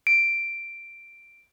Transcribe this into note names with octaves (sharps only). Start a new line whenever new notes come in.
D7